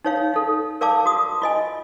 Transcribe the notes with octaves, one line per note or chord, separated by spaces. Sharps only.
D#4 C#5 F5
D#4 A4
A#4 D5 F5 A5 D6
F#4 D#6
F4 D#5 G#5